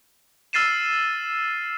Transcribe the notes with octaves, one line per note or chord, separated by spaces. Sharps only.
E6 F6 A6 C7 D#7 E7